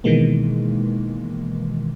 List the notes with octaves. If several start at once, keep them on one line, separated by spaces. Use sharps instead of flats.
B2 D#3 E3 G#3 A#3